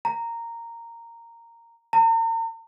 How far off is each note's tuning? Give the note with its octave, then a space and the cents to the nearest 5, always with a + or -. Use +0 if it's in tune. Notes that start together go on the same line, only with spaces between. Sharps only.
A#5 -10
A#5 -40